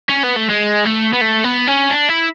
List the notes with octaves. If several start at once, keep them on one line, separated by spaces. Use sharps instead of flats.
C#4
B3
A3
G#3
A3
B3
A3
B3
C#4
D4
E4